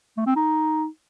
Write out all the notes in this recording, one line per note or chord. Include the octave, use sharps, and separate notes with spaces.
A3
C4
D#4